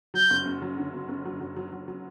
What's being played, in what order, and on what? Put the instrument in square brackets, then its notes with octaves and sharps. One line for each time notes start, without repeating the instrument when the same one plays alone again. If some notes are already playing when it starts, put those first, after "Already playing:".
[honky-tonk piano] F#3 [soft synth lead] G6
[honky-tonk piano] F#1
F#2
F#3
D3
F#1
F#1
F#3
F#3
F#3
F#3
F#3